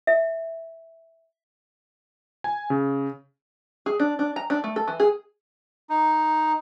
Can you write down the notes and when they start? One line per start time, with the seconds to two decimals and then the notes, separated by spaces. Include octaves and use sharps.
0.07 E5
2.44 G#5
2.70 C#3
3.86 G#4
4.00 D4
4.19 D4
4.36 A#5
4.50 D4
4.64 A3
4.76 A4
4.88 E3
5.00 G#4
5.90 D#4